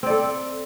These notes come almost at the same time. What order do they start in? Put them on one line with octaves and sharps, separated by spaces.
C4 D5 A4